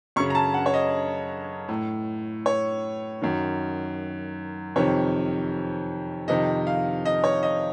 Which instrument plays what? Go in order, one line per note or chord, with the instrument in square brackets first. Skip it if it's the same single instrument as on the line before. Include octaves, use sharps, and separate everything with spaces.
[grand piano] F#2 C#6
C#3
A#5
A5
F#5
C#5
D#5
A2
C#5
F#2 D#3
F2 C3 D#3 C#5
F2 C3 D#3 D#5
F5
D#5
C#5
D#5